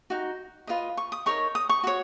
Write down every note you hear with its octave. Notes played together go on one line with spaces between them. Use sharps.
D#4 F#4
F4 B4 D#5
C#6
D#6
D#4 A#4 C#5 C#6
D#6
C#6
F#4 C#5